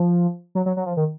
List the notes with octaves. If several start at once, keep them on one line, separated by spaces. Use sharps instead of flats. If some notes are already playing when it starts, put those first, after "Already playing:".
Already playing: F3
F#3
F#3
F#3
F3
D#3